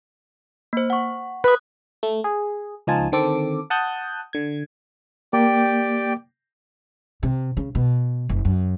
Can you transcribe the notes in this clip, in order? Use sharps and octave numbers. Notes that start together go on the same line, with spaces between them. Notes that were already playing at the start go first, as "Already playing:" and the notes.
A#3 C5
F#5 C#6
B4 D#6 F#6
A3
G#4
C#2 F3 D#4 F4 G#5 A5
D3 D#3 C4 A4 D6
F#5 A5 D#6 F#6 G6
D3 G#6
A#3 G4 D5 G5
C3
C#3
B2
F#1
F#2